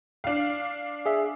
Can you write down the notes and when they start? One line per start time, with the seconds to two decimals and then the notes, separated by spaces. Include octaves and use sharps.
0.24 D4 F5
1.06 G#4 E5